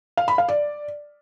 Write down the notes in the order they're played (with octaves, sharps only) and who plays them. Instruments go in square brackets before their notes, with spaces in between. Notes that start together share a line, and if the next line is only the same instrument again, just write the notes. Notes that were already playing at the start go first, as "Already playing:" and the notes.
[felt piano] F5
B5
F5
D5